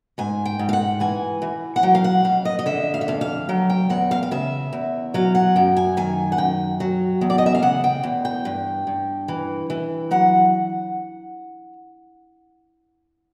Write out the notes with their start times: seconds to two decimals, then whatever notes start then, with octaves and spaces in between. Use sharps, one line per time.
0.18 G#2 G#5
0.45 G5
0.59 G#2
0.69 F5
0.73 F#5
1.00 E3 G#5
1.42 E3
1.76 F#5
1.83 F#3 G5
1.95 F5
2.04 F#5
2.24 F2 F5
2.45 D#5
2.59 D#5
2.66 D3 E5
2.94 F5
3.01 E5
3.08 F2 F5
3.21 F5
3.49 F#3 G5
3.70 G5
3.90 E2 F#5
4.11 F5
4.23 F5
4.31 C#3 E5
4.73 E2
5.14 F#3 F5
5.35 F#5
5.56 F#2 G5
5.77 G#5
5.97 D#3 G#5
6.32 F#5
6.38 F#2 G5
6.80 F#3
7.21 E2
7.30 D5
7.38 D#5
7.46 E5
7.55 F5
7.62 C#3 F#5
7.84 G5
8.03 E2
8.25 G5
8.45 G2
8.87 G2
9.28 E3
9.70 E3
10.11 F#3 F#5